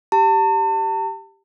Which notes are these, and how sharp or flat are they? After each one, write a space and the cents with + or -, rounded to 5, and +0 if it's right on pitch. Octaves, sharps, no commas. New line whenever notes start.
G4 +0 A5 +40